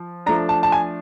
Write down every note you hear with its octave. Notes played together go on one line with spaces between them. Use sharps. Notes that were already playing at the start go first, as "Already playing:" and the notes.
Already playing: F3
F3 A3 D4 A#5
A5
A5
G#5